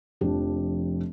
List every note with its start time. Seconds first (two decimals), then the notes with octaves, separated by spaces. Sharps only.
0.21 F1 F3 D4 G4